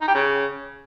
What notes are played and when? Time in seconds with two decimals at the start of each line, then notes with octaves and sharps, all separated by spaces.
0.01 D#4
0.08 G4
0.14 C#3